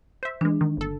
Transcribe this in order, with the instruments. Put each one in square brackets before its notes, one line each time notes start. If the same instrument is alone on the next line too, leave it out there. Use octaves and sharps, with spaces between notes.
[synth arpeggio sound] C5 E5
[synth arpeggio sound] E3 G#3 [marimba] D4
[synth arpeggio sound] D#3
G1 A4